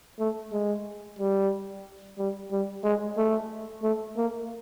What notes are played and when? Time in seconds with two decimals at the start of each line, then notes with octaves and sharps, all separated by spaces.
0.20 A3
0.52 G#3
1.19 G3
2.18 G3
2.51 G3
2.84 G#3
3.17 A3
3.83 A3
4.17 A#3